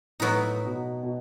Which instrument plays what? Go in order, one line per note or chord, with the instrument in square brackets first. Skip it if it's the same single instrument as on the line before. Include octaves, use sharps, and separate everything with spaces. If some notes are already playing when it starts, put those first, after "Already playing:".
[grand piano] A2 [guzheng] F#3 B3 D#4
[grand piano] B2
B2